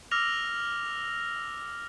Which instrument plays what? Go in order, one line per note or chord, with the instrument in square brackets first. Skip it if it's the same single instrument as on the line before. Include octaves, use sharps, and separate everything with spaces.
[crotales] D6 E6 F6 A#6 F7